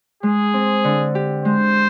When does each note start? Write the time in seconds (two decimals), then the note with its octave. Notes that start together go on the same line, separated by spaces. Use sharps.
0.23 G#3 G#4
0.54 C4
0.84 D3
1.15 G4
1.45 G#3 C5